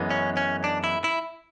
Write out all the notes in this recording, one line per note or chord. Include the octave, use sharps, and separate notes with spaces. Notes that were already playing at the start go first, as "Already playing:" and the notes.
Already playing: F#2 E3 G#3 B3
C#4
C#4
D4
E4
E4